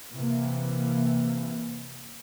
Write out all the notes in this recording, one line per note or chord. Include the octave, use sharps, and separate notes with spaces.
C3 E3 A#3